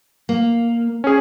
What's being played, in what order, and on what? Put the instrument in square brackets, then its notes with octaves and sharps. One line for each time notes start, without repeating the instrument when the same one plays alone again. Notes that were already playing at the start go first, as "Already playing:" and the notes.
[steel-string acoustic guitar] A#3
[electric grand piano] C#4 G#4